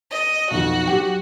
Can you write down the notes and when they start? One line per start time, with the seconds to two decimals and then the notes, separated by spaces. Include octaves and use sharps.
0.11 D#5
0.51 B1 F2 F#4
0.87 F#3 G4 G5